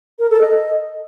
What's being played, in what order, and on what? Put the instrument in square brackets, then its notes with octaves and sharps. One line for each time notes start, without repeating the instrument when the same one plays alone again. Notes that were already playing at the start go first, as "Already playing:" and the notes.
[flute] A#4
A4
D#5